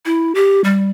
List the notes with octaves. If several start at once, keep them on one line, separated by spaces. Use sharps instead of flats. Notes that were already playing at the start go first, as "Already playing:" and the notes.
E4
G4
G3